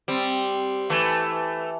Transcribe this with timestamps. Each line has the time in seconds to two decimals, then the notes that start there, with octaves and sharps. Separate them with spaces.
0.08 G3 C4
0.90 E3 A3